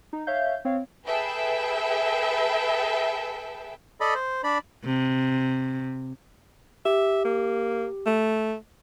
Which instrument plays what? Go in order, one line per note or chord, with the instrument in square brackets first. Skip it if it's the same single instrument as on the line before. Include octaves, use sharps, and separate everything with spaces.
[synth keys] D#4
C#5 E5 F5 G6
C4 C#5 F5
[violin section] G#4 A4 B4 E5 G5
[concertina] A4 D5 D#5 B5
C5
D4 D5 B5
[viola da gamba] C3
[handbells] G4 [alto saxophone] E5
[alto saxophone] A#3
A3